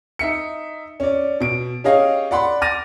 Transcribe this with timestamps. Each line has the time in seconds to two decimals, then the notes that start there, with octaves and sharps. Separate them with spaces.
0.19 D#4 E5 C#7
1.00 C#4 D5
1.40 B2 D7
1.84 C#4 G4 G#4 C#5 D#5 F5
2.31 D5 F#5 B5 C6
2.62 D6 F6 A6 A#6 D#7